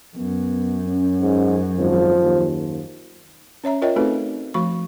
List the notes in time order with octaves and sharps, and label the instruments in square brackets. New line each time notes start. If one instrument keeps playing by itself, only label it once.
[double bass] F#2 [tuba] B3
[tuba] C#4
[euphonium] G#2
[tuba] G#1 [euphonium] F3
[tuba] D#2
[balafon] C#4 C#5 E5 A#5
F4 A#4 C#5 D#5 E5 G5
A3 C4 D#4 F#4 A4 B4
F3 A3 F#4 B5 C#6